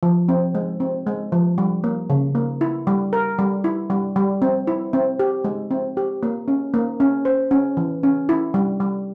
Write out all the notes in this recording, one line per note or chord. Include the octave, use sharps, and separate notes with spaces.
F3
C4
G#3
C4
G#3
F3
G3
A#3
C#3
A#3
E4
G3
A#4
G3
E4
G3
G3
C4
E4
C4
G4
G#3
C4
G4
A#3
C#4
A#3
C#4
C5
C#4
E3
C#4
E4
G3
G3